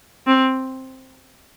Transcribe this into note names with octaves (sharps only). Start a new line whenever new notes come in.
C4